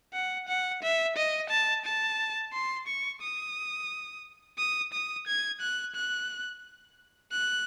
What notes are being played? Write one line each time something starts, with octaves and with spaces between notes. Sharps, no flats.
F#5
F#5
E5
D#5
A5
A5
C6
C#6
D#6
D#6
D#6
G#6
F#6
F#6
F#6